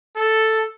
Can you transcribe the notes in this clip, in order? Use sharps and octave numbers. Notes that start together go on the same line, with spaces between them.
A4